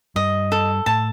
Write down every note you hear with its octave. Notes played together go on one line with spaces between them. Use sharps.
G2 D#5
A4
A2 A5